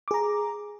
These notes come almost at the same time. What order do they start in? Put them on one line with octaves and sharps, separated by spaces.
D6 G#4 A#5